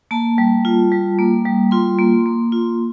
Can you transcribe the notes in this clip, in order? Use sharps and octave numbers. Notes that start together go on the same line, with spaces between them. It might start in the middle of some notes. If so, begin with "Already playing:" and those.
A#3 A5
G3
F4
G3
A#3
G3
F4 C6
A#3
A#3
F4